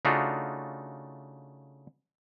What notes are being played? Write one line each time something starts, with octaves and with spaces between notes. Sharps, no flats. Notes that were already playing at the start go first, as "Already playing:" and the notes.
C#3 A3 D4 D#4 F4 F#4